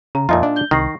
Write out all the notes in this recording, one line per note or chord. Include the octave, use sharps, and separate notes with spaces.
C#3 A#5
F2 A#2 D#4 F4 D#5 E5 A5
D4
G6 G7
C2 D#3 C#6 A#6 C7